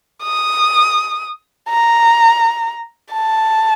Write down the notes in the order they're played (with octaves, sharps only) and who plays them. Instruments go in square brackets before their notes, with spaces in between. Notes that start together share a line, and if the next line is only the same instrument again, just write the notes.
[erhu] D#6
A#5
A5